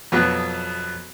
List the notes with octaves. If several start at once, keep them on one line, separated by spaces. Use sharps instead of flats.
F2 B2 F#3 B3